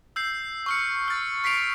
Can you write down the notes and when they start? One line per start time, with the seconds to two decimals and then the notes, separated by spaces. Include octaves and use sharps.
0.16 E6 G6 C7
0.66 C#6 F6 C#7
1.08 F6 A6
1.44 C#6 B6 C7 D7 F7